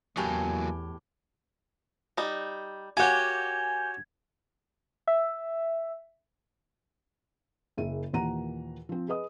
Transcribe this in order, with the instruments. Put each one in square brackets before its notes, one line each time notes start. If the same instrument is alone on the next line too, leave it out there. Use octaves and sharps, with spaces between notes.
[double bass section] E2 [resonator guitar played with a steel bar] A2 G4 [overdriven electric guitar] F#3 A#3 [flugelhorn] G#5
[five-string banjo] G3 D#4
[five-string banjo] A#3 F#5 [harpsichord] F#4 G4 C#5 [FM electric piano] G#5 G6 [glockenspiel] G#6
[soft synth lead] E5
[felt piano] F#1 A#3 G#4 E5 D#7
D#2 A#2 E3 F#5 A#5 D#7
F3 C4
G#4 B4 D#5 D#6